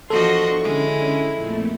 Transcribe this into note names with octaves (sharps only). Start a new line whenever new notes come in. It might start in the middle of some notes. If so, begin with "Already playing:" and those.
E2 F3 D4 F#4 A4 D#5 C6 C#6
D3 G#3 C#4 E4
F2 A#2 A3